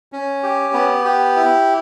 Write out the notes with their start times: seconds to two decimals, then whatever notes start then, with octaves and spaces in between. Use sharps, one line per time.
0.12 C#4
0.43 G4
0.74 B3
1.05 G4
1.36 E4